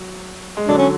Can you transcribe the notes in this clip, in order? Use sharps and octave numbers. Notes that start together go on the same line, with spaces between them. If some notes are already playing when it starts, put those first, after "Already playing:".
Already playing: F#3
G#3
D3 F#3 D4
C#4